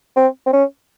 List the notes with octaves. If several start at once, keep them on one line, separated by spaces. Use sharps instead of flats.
C4
C4
C#4